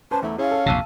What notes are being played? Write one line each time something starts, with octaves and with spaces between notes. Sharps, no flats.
C#4 B4 C5 A5
E2 A3 E4
C#4 E4 G#4 F5
A4
A#1 F2 C3 A5 E6 D#7